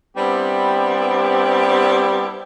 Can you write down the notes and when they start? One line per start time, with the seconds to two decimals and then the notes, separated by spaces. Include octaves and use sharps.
0.17 G3 B3 C4 D4 E4 G4